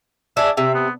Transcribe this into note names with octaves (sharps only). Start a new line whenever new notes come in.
D4 G#4 E5
C3 E5
B3